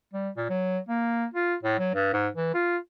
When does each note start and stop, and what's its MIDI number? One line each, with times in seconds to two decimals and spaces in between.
0.13 0.29 55
0.37 0.45 46
0.49 0.78 54
0.88 1.26 58
1.34 1.55 65
1.63 1.76 45
1.79 1.91 54
1.94 2.10 43
2.13 2.28 44
2.36 2.50 52
2.54 2.77 65